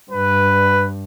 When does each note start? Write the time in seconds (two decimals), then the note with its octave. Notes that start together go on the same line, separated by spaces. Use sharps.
0.11 G2 B4